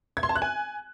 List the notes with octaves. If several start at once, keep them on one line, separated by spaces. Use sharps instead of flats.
G#6
C6
A5
F#6
G#5